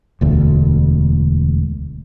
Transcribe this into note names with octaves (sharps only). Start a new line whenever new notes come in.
E1 D2